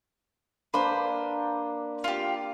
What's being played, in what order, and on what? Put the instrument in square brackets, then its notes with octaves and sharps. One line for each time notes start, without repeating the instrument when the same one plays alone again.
[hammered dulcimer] A#3 D4 [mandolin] B4 C5
[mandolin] F4 G4